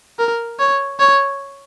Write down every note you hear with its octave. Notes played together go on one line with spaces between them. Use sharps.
A#4
C#5
C#5